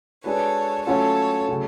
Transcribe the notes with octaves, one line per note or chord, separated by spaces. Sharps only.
G#3 D4 F#4 A4 B4 C#5
F#3 A3 C#4 F4 A4 C#5
C#3 F#3 A3